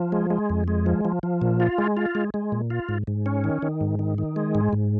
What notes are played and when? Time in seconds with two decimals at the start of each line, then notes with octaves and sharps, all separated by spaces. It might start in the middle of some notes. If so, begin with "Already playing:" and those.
Already playing: F3
0.12 G#3
0.30 G#3
0.50 F2
0.68 G#3
0.86 F3
1.05 F3
1.23 F3
1.42 A#2
1.60 F4
1.78 G#3
1.97 F4
2.15 G#3
2.34 G#3
2.52 A#2
2.70 F4
2.89 G#2
3.07 G#2
3.26 C#4
3.44 D#3
3.62 D#3
3.81 G#2
3.99 D#3
4.18 D#3
4.36 G#3
4.55 G#2
4.73 G#2